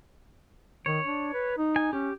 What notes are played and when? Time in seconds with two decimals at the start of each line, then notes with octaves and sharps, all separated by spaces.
0.86 D#3 C#5
1.05 D4
1.33 B4
1.58 D#4
1.76 G#5
1.93 C#4 G4